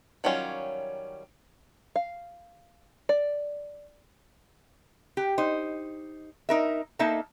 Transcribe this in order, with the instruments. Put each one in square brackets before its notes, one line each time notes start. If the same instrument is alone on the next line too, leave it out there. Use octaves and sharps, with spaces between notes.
[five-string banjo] D#3 F#3 G3 C#4 F4
F5
D5
[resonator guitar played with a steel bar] G4
D#4 C5
D#4 A#4 E5
A#3 D#4 A4 D#5 E5 A5